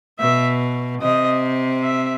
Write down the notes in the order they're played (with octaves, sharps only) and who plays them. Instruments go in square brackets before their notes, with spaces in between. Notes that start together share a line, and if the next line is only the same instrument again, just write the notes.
[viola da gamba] B2 [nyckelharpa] E5
[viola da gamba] C3 [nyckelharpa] D#5
[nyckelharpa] E5